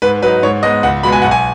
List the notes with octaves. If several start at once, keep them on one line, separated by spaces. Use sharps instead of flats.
G#2 B4
F#3 D#4 B4
G#2 C#5
G#3 B3 D#4 D#5
C#2 F#5
B2 G#3 B3 B5
G#5
B1 F#5
G#5